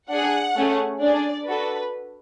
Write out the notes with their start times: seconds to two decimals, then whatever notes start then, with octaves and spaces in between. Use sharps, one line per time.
0.10 D4 G#4 F#5
0.56 A3 C#4 G#4
1.01 D4 G#4 D5
1.47 D4 F#4 A4 B4